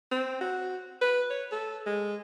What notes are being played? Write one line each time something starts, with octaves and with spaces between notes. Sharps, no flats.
C4
F#4
B4
C#5
A4
G#3